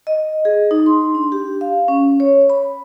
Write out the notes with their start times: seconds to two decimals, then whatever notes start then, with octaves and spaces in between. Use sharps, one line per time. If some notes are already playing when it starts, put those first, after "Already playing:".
0.07 D#5
0.45 G#4
0.71 D#4
0.86 C6
1.15 D4
1.32 G4
1.61 F5
1.88 C#4
2.20 C#5
2.50 B5